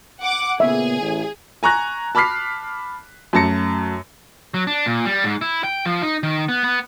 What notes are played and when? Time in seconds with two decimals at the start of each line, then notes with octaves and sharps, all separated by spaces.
0.21 F#5 D6
0.60 A#2 C#3 B3 G#4 E5
1.01 A1
1.63 G#5 A#5 C#6 F#6 A#6
2.15 A5 B5 D6 F6 B6 C7
3.33 F#2 A3 A5 A#6 C#7
4.54 F#3
4.67 D4
4.86 A#2
5.05 G3
5.24 G#2
5.41 E4
5.64 G5
5.85 F3
6.02 D#4
6.23 D#3
6.49 B3
6.64 B3